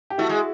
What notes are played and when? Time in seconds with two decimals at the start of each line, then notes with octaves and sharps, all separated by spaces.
0.10 G4
0.18 A3 E4 F#4
0.29 G#3